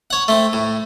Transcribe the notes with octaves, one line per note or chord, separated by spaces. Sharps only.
C#5 F#5
A3 C4
A2